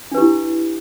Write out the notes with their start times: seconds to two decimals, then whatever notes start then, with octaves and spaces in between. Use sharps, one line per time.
0.12 D4
0.15 B4
0.18 G4
0.21 E4